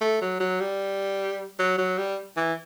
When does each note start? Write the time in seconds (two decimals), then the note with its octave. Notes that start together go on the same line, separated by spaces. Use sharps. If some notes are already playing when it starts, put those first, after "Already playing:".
0.01 A3
0.22 F#3
0.40 F#3
0.61 G3
1.59 F#3
1.78 F#3
1.98 G3
2.37 E3